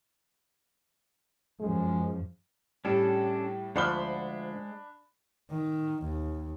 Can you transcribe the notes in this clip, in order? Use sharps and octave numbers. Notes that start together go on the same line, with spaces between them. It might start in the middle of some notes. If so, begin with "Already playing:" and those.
F#2 F3 G#3
A2 G3 C#4 D4 A4
D2 F3 G#3 D4 C5 F#5 B5 G7
D#3
D#2